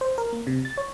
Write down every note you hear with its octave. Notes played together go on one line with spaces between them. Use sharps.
C5
A#4
A#3
C3
A6
C#5